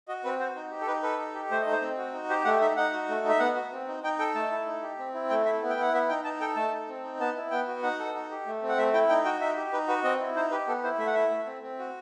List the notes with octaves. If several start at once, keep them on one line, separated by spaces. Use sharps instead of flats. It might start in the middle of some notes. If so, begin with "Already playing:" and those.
F#4 D#5
C4 B4
F#4 C5
D#4
G4
A4
D#4 B4
A4 B4
D#4
G4
A3 C5
D#4 D#5
C5
C4
F#4
D#4
G4 C5
A3 F#5
D#4 E5
D#4 F#5
F#4
A3
D#4
E5
B3 F#5
F#4
C4
D#4
D#4 G5
A4 G5
A3 A5
E4
D#4
G4
C4
E4
A3 G5
E4 E5
B3
G5
E4 F#5
B3 E5
D#4 G5
D#4 A5
A4 G5
A3 A5
D#4
C4
D#4
B3 A5
E4
B3 G5
F#4
D#4 F#5
A4
D#4
G4
A3
C4
F#5
A3 E5
E4 G5
D#4 G5
F#4 G5
D#4 E5
G4
D#4 B4
F#4 B4
C4 D#5
E4
D#4 C5
G4 B4
B3 A4
E4 C5
A3 E5
F#5
E4 E5
A3
C4
C4
F#4